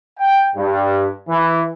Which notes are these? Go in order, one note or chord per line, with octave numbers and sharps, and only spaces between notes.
G5
G2
E3